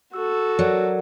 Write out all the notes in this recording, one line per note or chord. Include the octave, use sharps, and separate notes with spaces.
F#4 A4 E6
F#3 A#4 D5 F#5